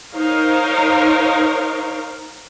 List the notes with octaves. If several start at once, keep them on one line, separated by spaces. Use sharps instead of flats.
D#4 A#4 C5 C#5 F5